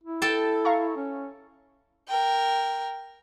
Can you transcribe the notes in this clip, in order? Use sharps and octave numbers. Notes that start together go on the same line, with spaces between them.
E4
A4 G5 A5
F5 A#5 C#6
C#4
A#4 G5